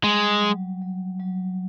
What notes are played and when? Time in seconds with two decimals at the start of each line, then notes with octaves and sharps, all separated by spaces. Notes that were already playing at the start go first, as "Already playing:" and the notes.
0.03 G3 G#3
0.42 F#3
0.82 F#3
1.20 F#3